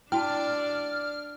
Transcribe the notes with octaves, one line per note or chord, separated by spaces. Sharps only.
D4 E4 F#4 D5 G5 A5 F6